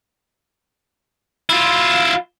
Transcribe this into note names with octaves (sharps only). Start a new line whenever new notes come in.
E4 F4